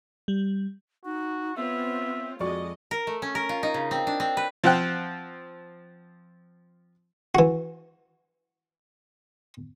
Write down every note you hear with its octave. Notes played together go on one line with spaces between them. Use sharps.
G3
D#4 F#4
B3 C4 F4 C#5 E5
F2 G#3 F#4 D5 D#5 C#6
A#4
A3
C#4
A#4
F4
D#4
C#3
C4
D4
C4
B4
F3 C4 C5 F#5 G5 F#6
E3 F#4